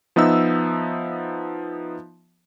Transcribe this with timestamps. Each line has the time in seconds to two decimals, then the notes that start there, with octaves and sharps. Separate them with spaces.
0.16 F3 B3 D#4 E5 E6